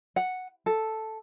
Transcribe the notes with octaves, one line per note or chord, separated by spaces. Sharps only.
F#5
A4